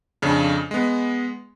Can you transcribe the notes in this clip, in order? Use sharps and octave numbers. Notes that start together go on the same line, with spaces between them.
F2 C#3 D4
G#3 B3